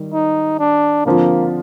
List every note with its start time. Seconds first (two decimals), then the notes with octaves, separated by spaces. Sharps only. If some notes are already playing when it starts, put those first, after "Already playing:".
Already playing: D#3 G3
0.13 D#4
0.59 D4
1.06 D3 F3 A#3 C4 F4